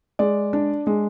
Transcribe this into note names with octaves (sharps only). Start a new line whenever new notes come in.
G#3 D5
D4
G#3